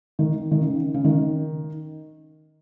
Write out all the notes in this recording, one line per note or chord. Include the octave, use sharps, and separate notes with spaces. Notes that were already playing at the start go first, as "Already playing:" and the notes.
D#3
D#3
C#3
C#3
D#3